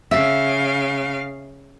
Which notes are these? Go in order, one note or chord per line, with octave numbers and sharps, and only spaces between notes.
C#3 E5 F5